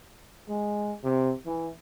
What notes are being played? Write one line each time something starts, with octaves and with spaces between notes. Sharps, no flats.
G#3
C3
E3